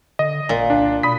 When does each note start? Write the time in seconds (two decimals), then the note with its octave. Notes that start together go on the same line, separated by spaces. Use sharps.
0.19 D3 D#5
0.49 G#1 A#2
0.70 C2 D4
1.03 B2 B5 D#6 B6